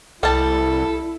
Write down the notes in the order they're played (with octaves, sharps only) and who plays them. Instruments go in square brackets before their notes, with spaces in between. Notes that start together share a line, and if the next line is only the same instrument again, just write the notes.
[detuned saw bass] C2 [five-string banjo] G3 A5 [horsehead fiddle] E4 [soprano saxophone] A4